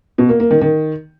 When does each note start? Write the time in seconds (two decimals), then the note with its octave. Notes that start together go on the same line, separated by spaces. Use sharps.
0.18 B2
0.29 A#3
0.40 A#3
0.51 D#3
0.61 D#3